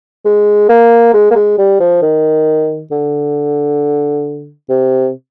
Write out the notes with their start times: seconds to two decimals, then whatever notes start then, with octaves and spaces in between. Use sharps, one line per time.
0.25 G#3
0.69 A#3
1.14 G#3
1.31 A#3
1.36 G#3
1.58 G3
1.80 F3
2.02 D#3
2.91 D3
4.69 C3